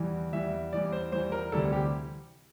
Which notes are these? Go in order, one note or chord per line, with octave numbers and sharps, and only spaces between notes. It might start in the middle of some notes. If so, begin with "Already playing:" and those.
Already playing: E2 E3 G3
E2 E3 G3 E5
E2 E3 G3 D5
C5
E2 E3 G3 C5
A#4
D2 C3 E3 G3 A4
G4